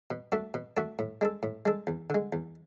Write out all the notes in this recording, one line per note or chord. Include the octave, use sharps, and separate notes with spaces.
B2
A3 D4 F#4 A4
B2
A3 D4 F#4 A4
A2
G#3 D4 A4
A2
G#3 D4 A4
E2
D3 G#3
E2